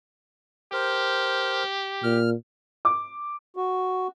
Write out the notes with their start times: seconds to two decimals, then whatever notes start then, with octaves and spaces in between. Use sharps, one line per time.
0.73 G4 A#4 C5
2.03 A#2 F6
2.85 D6
3.56 F#4